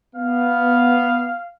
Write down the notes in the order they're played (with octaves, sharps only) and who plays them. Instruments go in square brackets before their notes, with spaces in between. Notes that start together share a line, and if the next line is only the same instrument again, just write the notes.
[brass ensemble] B3 [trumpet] F5